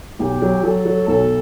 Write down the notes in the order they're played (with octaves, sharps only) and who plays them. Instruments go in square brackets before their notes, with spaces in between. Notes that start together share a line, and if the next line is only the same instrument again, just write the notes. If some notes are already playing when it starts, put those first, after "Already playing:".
[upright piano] B1 [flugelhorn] G4
[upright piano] F#3
[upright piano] F#3 [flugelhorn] A4
[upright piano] F#3
[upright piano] B1 [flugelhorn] A4